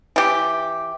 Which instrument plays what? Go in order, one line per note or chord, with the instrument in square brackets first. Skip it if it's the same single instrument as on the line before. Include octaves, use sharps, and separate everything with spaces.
[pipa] E3 G4